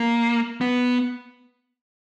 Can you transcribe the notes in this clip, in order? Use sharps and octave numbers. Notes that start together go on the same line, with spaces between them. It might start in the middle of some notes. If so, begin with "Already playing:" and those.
Already playing: A#3
B3